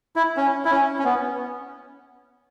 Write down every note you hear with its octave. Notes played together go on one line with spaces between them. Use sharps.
E4
C#4
E4
C#4
C#4
B3